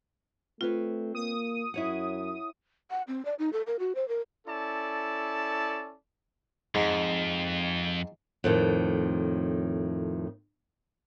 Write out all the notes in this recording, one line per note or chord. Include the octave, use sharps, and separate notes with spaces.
A3 C4 F4 B4 C#5
A#3 D#6
F#2 E4 C#5 F#5
F#5
C4
D5
D#4
A4
A#4
F#4
C5
A#4
C#4 E4 A4 D5 A5
F2 G#2
F2 A2 D3 D#3